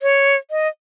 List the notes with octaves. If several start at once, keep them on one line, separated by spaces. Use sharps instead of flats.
C#5
D#5